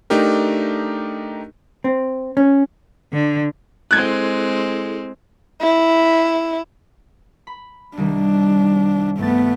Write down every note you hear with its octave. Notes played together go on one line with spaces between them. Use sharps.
A3 D4 D#4 G4 A#4
C4
C#4
D3
G#3 C4 E4 G#4 A4 F#6 G#6
E4
B5
C2 D#3 G3 D4
G2 A3 B3 A6